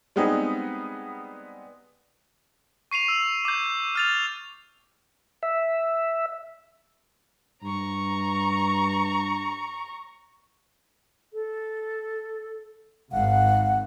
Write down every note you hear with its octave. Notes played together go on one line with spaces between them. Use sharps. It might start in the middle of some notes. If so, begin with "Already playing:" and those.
G3 G#3 B3 C4 D#4 G#4
C#6 C7 D#7 F7
E6
D6 G6
F6 A6 F7
E5
G2 A#5 C#6
A4
G#1 F5 F#5